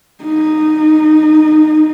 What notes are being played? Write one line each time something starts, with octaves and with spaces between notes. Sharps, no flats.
D#4